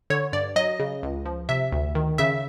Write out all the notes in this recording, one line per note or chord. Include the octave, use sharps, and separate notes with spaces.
D3 C#5
G2 D5
F#3 D#5
C#3
C#2
F3
C3 E5
D2
D#3
C#3 E5